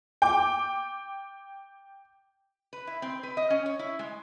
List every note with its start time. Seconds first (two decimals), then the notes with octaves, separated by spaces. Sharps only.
0.22 G5 D6
2.73 B4
2.87 E4
3.02 C4
3.23 B4
3.37 D#5
3.50 C#4
3.66 C#5
3.79 E4
3.99 G#3